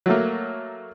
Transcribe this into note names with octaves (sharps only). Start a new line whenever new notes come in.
F#3 A3 A#3